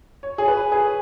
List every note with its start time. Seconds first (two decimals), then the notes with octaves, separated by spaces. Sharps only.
0.23 C#5
0.38 G#4
0.48 B4
0.72 G#4